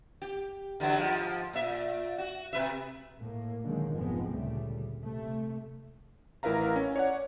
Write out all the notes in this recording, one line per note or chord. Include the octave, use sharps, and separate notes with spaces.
G4
D3 E3 F#3
G#2 F3
A#2 E5
F#4
C3 B4 E5
A2 A#3
B2 D3 D#3 F#3 G#3 A#3
F1 G#2 F3 G#3 B3 C4
D2 A#2 C#3 G3 A3
C3 A3
A1 E4 A#4 B4 F5 A#5
C#4
C#5 D5 F#5